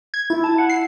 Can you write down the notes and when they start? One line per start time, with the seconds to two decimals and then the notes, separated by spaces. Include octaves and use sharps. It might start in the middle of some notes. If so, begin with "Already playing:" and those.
0.14 G#6
0.30 E4
0.44 A5
0.58 F#5
0.70 C7